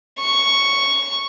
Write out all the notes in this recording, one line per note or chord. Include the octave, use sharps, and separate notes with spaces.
C#6